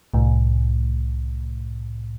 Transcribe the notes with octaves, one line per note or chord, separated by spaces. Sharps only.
C2 A2